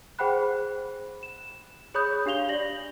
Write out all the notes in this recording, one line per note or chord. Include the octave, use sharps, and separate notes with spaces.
G#4 C5 F#5 G5 B5 F#6
E7
G#4 C#5 B5 D#6 G6
D4 G4 F5 F7 G7
D5 A#6 F#7